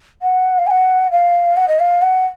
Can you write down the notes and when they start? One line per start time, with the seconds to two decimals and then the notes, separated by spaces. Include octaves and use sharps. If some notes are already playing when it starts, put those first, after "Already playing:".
0.22 F#5
0.58 F5
0.67 G#5
0.70 F#5
1.11 F5
1.57 F#5
1.68 D#5
1.79 F5
2.02 F#5